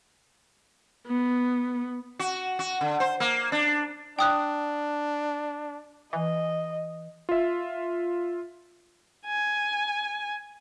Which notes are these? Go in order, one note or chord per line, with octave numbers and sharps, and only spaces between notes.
B3
F#4
F#4
D3
C5
A#3
D4
D4 G5 D#6 F#6
E3 D#5
F4 E5
G#5